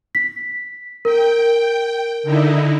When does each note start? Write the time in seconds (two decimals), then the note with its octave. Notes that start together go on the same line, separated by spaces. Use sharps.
0.15 B6
1.05 A#4 G5
2.23 D3 D#4 E4